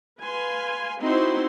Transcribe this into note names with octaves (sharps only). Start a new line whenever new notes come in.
B4 F5 G#5 C6
C4 D#4 E4 F#4 C5 C6